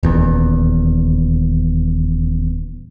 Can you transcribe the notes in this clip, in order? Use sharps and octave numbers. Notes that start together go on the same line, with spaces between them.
D#1 E2